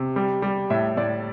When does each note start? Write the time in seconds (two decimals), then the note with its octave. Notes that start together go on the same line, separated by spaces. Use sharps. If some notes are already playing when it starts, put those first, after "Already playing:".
Already playing: C3
0.16 G3
0.42 G3
0.70 A2 E5
0.97 A2 D5